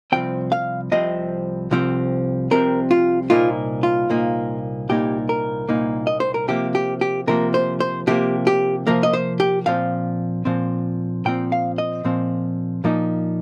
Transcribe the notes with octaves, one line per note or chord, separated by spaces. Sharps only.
C2 C3 F3 C4 G5
F5
C2 C3 F3 C4 D#5
C2 C3 F3 C4
C2 C3 F3 C4 A#4
F4
C2 A#2 A#3 D#4 F4
F4
C2 A#2 A#3 D#4
C2 A#2 A#3 D#4 G4
A#4
C2 A#2 A#3 D#4
D#5
C5
A#4
C3 F3 A#3 G4
G4
G4
C3 F3 A#3 A#4
C5
C5
C3 F3 A#3 G4
G4
C3 F3 A#3 A#4
D#5
C5
G4
A#2 F3 C4 F5
A#2 F3 C4
A#2 F3 C4 G5
F5
D#5
A#2 F3 C4
A#2 F3 A#3 D#4